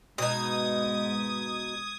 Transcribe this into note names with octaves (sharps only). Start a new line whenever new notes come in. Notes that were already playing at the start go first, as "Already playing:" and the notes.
G#2 B2 D#4 D#6 G#6